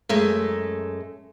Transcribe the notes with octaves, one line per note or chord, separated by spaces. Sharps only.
F#2 G#3 A3